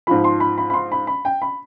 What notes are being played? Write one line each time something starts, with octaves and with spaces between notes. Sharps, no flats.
G#2 F3 B5
C6
B5
B5
B5
C6
B5
B5
G5
B5